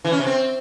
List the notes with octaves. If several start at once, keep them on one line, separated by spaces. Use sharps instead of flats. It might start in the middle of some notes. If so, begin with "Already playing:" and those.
E3
C#4
C3
C4